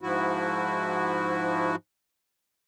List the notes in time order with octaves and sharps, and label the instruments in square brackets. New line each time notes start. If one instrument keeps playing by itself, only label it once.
[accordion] G#2 F3 E4 F#4